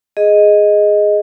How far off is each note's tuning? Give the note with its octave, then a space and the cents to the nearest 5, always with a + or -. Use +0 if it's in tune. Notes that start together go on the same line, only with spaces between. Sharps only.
G#4 +0 D#5 +0